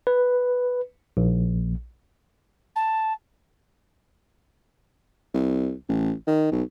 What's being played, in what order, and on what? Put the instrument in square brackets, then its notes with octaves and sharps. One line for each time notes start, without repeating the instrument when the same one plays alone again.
[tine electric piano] B4
A#1
[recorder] A5
[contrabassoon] C2
A1
D#3
B1